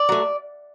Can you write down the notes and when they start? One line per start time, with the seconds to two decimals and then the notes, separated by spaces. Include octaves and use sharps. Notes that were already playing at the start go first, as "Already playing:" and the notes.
Already playing: D5
0.09 F#3 A3